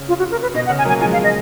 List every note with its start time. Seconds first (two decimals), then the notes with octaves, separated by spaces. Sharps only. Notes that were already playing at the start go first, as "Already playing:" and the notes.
Already playing: C#3
0.09 F4
0.19 F#4
0.31 A#4
0.42 B4
0.54 B2 D#5
0.66 F#5
0.70 C#3
0.78 G#5
0.85 F#3 A#3
0.89 G#5
1.01 F3 G#3 G#5
1.13 F5
1.24 D#5